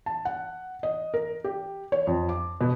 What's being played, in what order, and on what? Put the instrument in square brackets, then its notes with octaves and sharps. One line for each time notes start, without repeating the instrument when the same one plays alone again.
[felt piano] A5
F#5
D#5
A#4
G4
C#5
F2
D6
B2